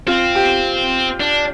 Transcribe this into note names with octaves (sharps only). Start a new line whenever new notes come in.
C4 F4
G4
D4